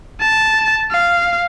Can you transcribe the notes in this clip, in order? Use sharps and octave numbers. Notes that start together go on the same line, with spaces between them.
A5
F5